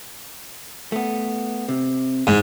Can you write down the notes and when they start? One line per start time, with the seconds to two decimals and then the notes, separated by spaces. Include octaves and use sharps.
0.92 A3 B3
1.68 C3
2.27 G#2 E3